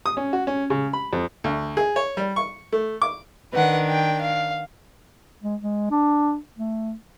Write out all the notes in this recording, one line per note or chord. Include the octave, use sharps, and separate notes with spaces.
D#6
C#4
F#4
C#4
C#3
B5
F2
D2
G#4
C#5
G3
C#6
A3
D6
D#3 D4 B4 F#5
G5
F5
G#3
G#3
D4
A3